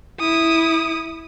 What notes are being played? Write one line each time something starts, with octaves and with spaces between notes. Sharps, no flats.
E4 D#6